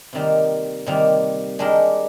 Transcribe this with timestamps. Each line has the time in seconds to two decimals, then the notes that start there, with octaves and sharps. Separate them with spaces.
0.13 C3 D#3 G3 A#3
0.87 C3 D#3 G3 A#3
1.59 G#3 D4 G4 A#4